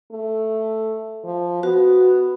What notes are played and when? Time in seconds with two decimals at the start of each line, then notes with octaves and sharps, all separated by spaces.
0.12 A3
1.24 F3
1.63 B3 F#4